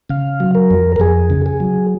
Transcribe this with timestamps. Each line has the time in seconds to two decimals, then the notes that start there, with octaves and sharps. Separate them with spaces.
0.09 C#3 F5
0.40 F#3
0.55 A#4
0.71 F2
0.96 A#4
1.00 F2 G#4
1.30 C#3
1.46 G#4
1.60 F#3